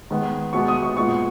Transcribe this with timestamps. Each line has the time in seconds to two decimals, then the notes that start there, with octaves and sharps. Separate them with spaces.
0.10 D#3 G#3 B3
0.53 B2 G#3 B3 C#6
0.68 D#6
0.83 C#6
0.97 A#2 G#3 B3 C#6